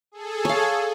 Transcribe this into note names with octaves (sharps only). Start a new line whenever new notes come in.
G#4 A4
C#5 F5